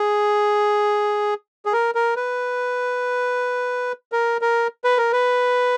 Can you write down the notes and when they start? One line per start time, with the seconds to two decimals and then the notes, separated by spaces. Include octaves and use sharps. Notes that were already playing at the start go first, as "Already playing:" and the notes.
Already playing: G#4
1.65 G#4
1.73 A#4
1.95 A#4
2.16 B4
4.12 A#4
4.41 A#4
4.84 B4
4.98 A#4
5.12 B4